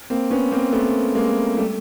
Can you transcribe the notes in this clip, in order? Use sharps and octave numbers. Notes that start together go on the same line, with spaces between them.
A#3 C4
B3 C#4
A#3 C4
A3 B3
G#3 A#3
G3 A3